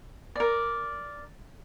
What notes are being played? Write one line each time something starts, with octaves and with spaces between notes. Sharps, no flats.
A#4 D5